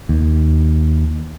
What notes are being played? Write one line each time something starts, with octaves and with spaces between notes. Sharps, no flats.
D#2